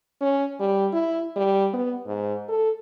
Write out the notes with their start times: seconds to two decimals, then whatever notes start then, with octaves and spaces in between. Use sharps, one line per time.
0.21 C#4
0.60 G3
0.93 E4
1.36 G3
1.73 B3
2.06 G#2
2.48 A4